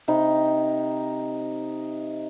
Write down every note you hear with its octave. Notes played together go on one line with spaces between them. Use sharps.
C3 D#4 B5